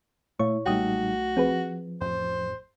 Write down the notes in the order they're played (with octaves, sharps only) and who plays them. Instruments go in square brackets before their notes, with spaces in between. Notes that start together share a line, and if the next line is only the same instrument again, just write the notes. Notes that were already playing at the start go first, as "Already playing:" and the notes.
[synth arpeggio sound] A#2 C#5 C#6 [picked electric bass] A3 [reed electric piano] E4
[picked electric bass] B1 A3 [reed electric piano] A#2 G3 D#4 [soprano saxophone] F#4 [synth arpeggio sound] G5 D#6
[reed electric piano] F3 [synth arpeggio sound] C4 G#4 B4
[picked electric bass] A1 F2 [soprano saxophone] C5